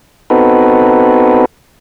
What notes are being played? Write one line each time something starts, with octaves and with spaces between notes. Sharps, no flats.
B3 C4 D#4 F#4 A4 B4